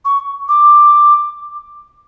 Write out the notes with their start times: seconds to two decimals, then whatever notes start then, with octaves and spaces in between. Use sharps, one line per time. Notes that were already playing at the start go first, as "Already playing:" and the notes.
0.05 C#6
0.49 D6